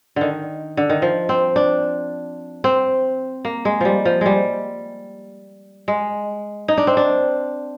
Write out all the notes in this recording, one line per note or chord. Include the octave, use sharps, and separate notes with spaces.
D3 D#3
D3
D#3
F3
C4
D4
C4
A#3
G#3
F3 G3
F3
G3 G#3
G#3
D#4
D4
C4
D4